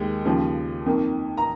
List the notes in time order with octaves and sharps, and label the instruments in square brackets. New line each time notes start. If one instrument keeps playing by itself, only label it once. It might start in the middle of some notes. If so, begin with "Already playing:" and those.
Already playing: [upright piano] D#2 D#3 G#3
D#2 C#3 F3
F2 D#3 A#3
A#5